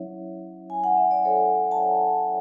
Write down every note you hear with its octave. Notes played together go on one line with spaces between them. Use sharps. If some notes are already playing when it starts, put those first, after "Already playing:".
Already playing: F#3 C#4 E4 C#5 E5
G#5
F#5
E5
D5
A4 C#5
F#5 A5